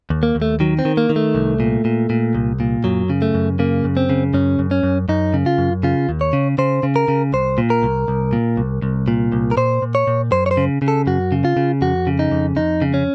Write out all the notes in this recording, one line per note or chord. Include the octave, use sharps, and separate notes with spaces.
D#2
A#3
D#2
A3
D#3 F#3
C4
D#3
A#3
D#3
A3
C2
A#2
A#2
A#2
C2
A#2
F#2 F#3
C#3
A3
F#2
C#3 A#3
F#2
C4
C#3
F#2 C#4
F#2
C#4
F#2
F#2 D#4
C#3
F4
F#2
C#3 F4
D#2
C#5
C#3
C#3 C5
C#3
A#4
C#3
C2 C5
A#2
A#4
C2
C2
A#2
C2
C2
A#2
C2
A#4
A#2 C5
A#2
C#5
A#2
F#2 C5
C#5
C5
C#3
C#3
A4
F#2 F#4
C#3
F4
C#3
F2 F#4
C#3
D#4
F2
F2 D#4
C#3
C#4